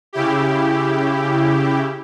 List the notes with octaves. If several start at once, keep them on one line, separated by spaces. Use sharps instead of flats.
C#3 E4 G4